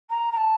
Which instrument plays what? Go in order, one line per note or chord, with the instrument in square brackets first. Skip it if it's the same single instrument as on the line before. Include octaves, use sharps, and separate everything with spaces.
[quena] A#5
A#5
A5